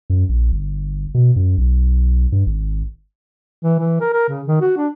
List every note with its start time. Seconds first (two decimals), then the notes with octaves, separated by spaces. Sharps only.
0.10 F#2
0.29 A#1
0.52 G1
1.15 B2
1.36 F#2
1.57 B1
2.32 G2
2.46 G#1
3.63 E3
3.79 E3
4.00 A#4
4.13 A#4
4.29 C#3
4.47 D#3
4.61 F#4
4.77 D4